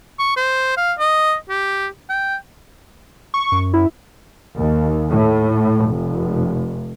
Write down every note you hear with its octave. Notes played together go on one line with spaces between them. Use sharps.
C#6
C5
F5
D#5
G4
G5
C#6
F#2
E4
D#2
A2
F1